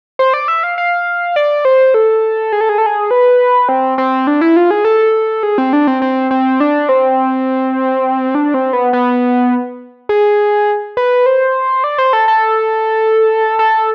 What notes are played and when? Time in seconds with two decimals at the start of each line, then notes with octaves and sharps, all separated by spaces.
0.19 C5
0.34 D5
0.48 E5
0.63 F5
0.78 F5
1.36 D5
1.65 C5
1.94 A4
2.52 G#4
2.61 A4
2.69 G#4
2.78 A4
2.86 G#4
3.11 B4
3.69 C4
3.98 C4
4.27 D4
4.41 E4
4.56 F4
4.71 G#4
4.85 A4
5.43 G#4
5.58 C4
5.73 D4
5.87 C4
6.02 C4
6.31 C4
6.60 D4
6.89 C4
8.35 D4
8.54 C4
8.73 B3
8.93 B3
10.09 G#4
10.97 B4
11.26 C5
11.84 D5
11.98 C5
12.13 A4
12.28 A4
13.59 A4